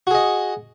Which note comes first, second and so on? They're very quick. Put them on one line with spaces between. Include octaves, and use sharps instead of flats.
F#4 G#4 D#5